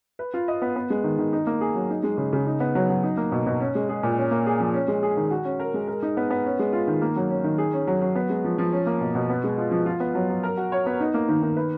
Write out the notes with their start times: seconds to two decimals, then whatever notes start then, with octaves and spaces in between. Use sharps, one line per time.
0.19 B4
0.34 F4
0.48 D#5
0.62 B3
0.76 B3
0.90 G#3
1.04 D#3
1.18 D#3
1.33 D#4
1.47 A#3
1.61 G#4
1.75 F#3
1.90 D#4
2.03 G#3
2.18 C#3
2.33 C#3
2.47 D#4
2.60 B3
2.75 F#3
2.90 F#3
3.03 D#4
3.17 A#3
3.32 B2
3.46 B2
3.60 C#4
3.75 G#3
3.89 G#4
4.03 A#2
4.18 C#4
4.31 A#3
4.46 G#4
4.60 F3
4.74 C#4
4.88 G#3
5.03 G#4
5.17 D#3
5.31 F#4
5.45 C#4
5.60 A#4
5.74 G#3
5.87 A#4
6.02 D#4
6.17 B3
6.30 B3
6.45 C#4
6.59 G#3
6.73 F4
6.87 D#3
7.02 A#3
7.16 F#3
7.30 C#4
7.44 D#3
7.58 G#4
7.73 C#4
7.87 F#3
8.01 F#3
8.15 B3
8.30 G#3
8.44 F3
8.58 F3
8.72 C#4
8.86 A#3
9.01 B2
9.15 B2
9.30 B3
9.44 G#3
9.58 F4
9.71 F3
9.86 F4
10.00 B3
10.15 F#3
10.29 F#3
10.43 A#4
10.57 F#4
10.72 C#5
10.86 B3
11.00 D#4
11.14 A#3
11.29 D#3
11.43 D#3
11.56 B4